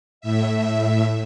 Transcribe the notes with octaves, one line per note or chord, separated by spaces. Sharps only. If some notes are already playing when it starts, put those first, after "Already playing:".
A2 E5